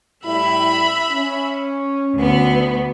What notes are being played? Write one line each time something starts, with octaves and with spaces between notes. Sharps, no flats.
A2 G3 E4 E5 B5 F#6
C#4
D2 B3